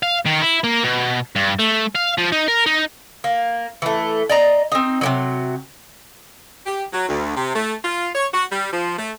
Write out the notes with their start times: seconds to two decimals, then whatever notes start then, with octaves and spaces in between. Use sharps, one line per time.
0.03 F5
0.26 D#3
0.42 E4
0.64 A#3
0.84 B2
1.36 G2
1.59 A3
1.95 F5
2.18 F3
2.32 D#4
2.48 A#4
2.66 D#4
3.24 A#3
3.82 E3 A3
4.29 D5 D#5 A#5
4.72 C4 D#4
5.01 C3 D#3 F#3
6.66 G4
6.93 F#3
7.09 D2
7.36 C3
7.55 A3
7.85 F4
8.14 C#5
8.33 F#4
8.51 G3
8.72 F3
8.98 A3